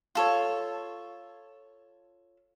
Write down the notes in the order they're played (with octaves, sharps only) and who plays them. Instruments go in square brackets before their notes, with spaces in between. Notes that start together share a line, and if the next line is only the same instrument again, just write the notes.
[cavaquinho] F4 A4 C#5